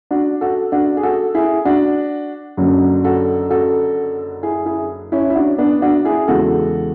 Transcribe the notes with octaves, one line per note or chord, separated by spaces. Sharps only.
D4 F#4
F#4 A4
D4 F#4
G#4
F#4 A4
E4 G#4
D4 F#4
F#1 F#2 D3 F#3
F#4 A4
F#4 A4
E4 G#4
E4 G#4
C#4 E4
E4
D4 F#4
B3 D4
D4 F#4
E4 G#4
E2 C#3 E3 G#3 F#4 A4